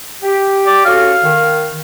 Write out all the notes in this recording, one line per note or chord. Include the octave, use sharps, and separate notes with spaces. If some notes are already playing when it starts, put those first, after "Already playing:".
G4
D5
C#4 F#4 A4 F5
D#3